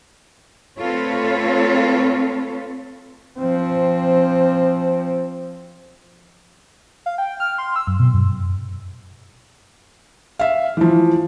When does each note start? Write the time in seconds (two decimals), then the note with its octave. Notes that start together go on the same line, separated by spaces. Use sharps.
0.78 A3 C4 F4 A4 B4 C#5
3.39 F3 C4
7.06 F5
7.18 G5
7.40 F6
7.58 C6
7.76 E6
7.87 F#2
7.99 B2
8.13 F#2
10.39 E5 F5
10.77 E3 F3